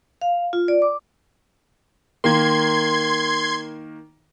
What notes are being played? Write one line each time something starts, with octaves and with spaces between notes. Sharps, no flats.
F5
F4
D5
D6
D#3 A#3 C6 G#6